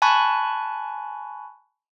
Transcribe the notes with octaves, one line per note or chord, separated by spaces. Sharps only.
G#5 A5 B5 C#6 F#6